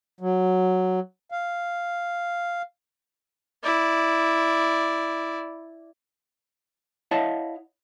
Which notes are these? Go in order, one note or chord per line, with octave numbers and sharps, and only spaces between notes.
F#3
F5
E4 D5
E4 C#5 D#5 F5 F#5 A5